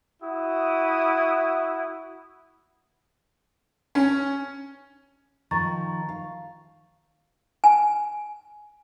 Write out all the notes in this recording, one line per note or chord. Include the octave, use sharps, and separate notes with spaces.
E4 F#4 D#6
C#4
D#3 F3 F4 A#5 C#6 A6
F5
G#5